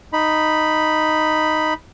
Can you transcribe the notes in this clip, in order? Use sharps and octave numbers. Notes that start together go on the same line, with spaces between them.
D#4 B5